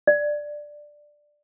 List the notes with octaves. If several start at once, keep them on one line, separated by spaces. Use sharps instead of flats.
D5